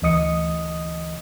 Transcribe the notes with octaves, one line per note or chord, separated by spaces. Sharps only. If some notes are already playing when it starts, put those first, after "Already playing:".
D2 E3 D#5 D#6 C#7